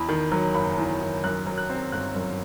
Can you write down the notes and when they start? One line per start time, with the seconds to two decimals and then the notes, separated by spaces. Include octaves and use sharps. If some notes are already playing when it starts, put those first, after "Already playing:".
Already playing: E2 B5
0.09 D#3
0.32 F#3
0.54 F#1 B5
0.77 E2
1.01 D#3
1.24 F#2 F#6
1.47 F#3
1.58 F#6
1.70 C4
1.92 G1 F#6
2.16 F#2